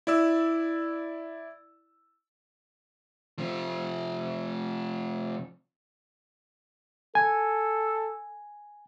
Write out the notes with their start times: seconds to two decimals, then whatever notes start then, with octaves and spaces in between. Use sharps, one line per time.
0.07 E4 D5 E6
3.38 C3 F3
7.15 A4 G#5